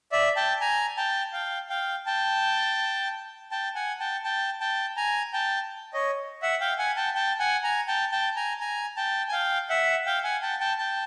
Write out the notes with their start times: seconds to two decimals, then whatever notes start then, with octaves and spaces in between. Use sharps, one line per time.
0.12 D5 E5
0.36 G5 A5
0.61 G#5 A#5
0.97 G5 A5
1.33 F5 G5
1.69 F5 G5
2.06 G5 A5
3.51 G5 A5
3.75 F#5 G#5
4.00 G5 A5
4.24 G5 A5
4.60 G5 A5
4.97 G#5 A#5
5.33 G5 A5
5.94 C#5 D#5
6.42 E5 F#5
6.61 F5 G5
6.78 F#5 G#5
6.97 G5 A5
7.15 G5 A5
7.39 F#5 G#5
7.64 G#5 A#5
7.88 G5 A5
8.12 G5 A5
8.36 G#5 A#5
8.60 G#5 A#5
8.96 G5 A5
9.29 G#5
9.33 F5 G5
9.69 E5 F#5
10.06 F5 G5
10.24 F#5 G#5
10.42 G5 A5
10.60 G5 A5
10.79 G5 A5